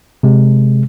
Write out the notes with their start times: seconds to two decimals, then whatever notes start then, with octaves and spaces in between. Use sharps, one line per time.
0.23 C3 G#3